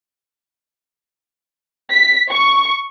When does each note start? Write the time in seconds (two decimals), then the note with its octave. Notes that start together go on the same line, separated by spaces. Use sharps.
1.92 B6
2.31 C#6